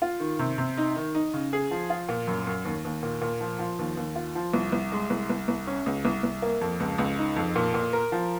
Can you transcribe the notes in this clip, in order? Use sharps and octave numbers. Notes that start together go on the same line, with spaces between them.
F4
D#3
C3
C3
D#4
D#3
D#4
C#3
G#4
F3
F4
A#2
F#2
F#2
D#2
D#2
A#2
A#2
F3
F3
D#2
D#2
F4
F3
C2
C2
G#3
C2
C2
C2
C#4
C#2
C2
C2
A#3
F2
C#2
C#2
D#4
F2
A#2
A#2
A#4
F3